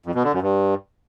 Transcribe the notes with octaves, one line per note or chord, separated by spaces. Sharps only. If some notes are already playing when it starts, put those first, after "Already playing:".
F2
B2
D3
F#2
G2